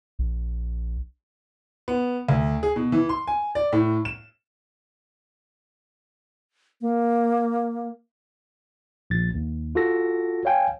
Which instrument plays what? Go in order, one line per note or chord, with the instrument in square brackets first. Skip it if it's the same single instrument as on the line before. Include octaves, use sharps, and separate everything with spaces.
[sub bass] A#1
[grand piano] B3
D2
G#4
B2
E3
C6
G#5
D5
A2
E7
[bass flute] A#3
[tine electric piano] A#1 A6
D#2
F4 F#4 A4 A#6
C#5 F5 G5 G#5